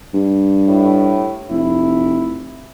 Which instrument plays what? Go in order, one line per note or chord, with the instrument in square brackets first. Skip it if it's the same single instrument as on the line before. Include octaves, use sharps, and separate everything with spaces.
[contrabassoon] G2
[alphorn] A2
[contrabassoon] F1 [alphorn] E4